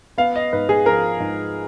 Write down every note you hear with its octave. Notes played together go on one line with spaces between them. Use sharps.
B3 F5
D#5
G#2 B4
G#4
F3 A#4
G#2